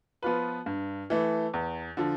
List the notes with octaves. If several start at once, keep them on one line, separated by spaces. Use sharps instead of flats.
F3 B3 F4 B4
G2
E3 A3
E2
D3 F3